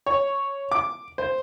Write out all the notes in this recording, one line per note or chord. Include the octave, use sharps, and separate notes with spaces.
C#5
D6
C5